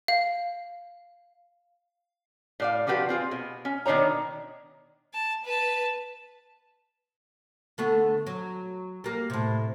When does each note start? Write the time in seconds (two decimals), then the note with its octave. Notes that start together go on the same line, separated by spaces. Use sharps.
0.08 F5
2.60 A2 D5 F5
2.87 D3 F3 F#4 G4 B4
3.09 C4 F4 G#4
3.31 B2
3.65 C#4
3.86 B2 D#3 C#4 D4 C#5 A#5
5.14 A5
5.44 B4 A5
7.78 D3 A3 B3
8.27 F#3
9.04 G3 A#3
9.30 A2 C3